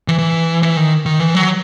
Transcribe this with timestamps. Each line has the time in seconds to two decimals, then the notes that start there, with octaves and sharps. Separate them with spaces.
0.08 E3
0.19 E3
0.63 E3
0.77 D#3
1.06 D#3
1.20 E3
1.34 F#3